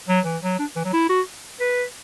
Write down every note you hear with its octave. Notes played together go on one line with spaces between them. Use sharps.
F#3
E3
F#3
D4
E3
F#3
E4
F#4
B4